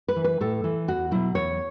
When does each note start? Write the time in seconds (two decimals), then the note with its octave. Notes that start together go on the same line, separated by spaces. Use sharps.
0.08 B4
0.16 E3
0.24 B4
0.41 A2 A4
0.64 E3
0.88 E2 F#4
1.11 B2 F#3 E4
1.35 E2 C#5